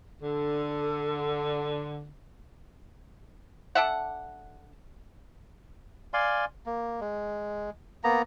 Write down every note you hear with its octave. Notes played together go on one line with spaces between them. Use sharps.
D3 A4
D4 A4 E5 F#5
D5 F5 G#5 C6
A#3
G#3
A#3 B3 A#5